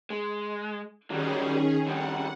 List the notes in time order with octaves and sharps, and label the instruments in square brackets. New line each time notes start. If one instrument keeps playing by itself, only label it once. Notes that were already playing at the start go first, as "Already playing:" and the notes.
[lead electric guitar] G#3
[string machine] D#3 C#4 G#4 [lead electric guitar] F#3 G3
[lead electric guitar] F2 G3 [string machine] F#5